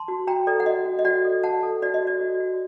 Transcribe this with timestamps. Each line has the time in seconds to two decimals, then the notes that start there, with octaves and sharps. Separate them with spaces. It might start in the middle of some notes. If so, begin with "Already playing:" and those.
Already playing: A5 C6
0.08 F#4
0.27 F#4 G5 A#5
0.47 A4 D5
0.60 F#5
0.66 F#4 D#5
0.85 F#4
0.99 D#5
1.05 F#4 D5 F#5
1.24 A4
1.43 F#4 F#5 A5
1.63 A4
1.82 F#4 D5
1.94 D#5
2.02 F#4
2.07 D5
2.21 F#4
2.40 F#4